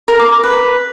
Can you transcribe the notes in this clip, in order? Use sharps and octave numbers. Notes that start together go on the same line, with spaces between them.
A#4
D6
B4